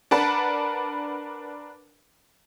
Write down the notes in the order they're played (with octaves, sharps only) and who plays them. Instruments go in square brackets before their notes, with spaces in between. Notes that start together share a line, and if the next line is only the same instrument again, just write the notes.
[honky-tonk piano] D4 A#4 B4 F#5 A5 B5